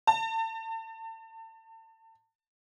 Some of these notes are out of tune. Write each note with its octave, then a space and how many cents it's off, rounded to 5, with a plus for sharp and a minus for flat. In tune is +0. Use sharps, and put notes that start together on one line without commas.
A5 +35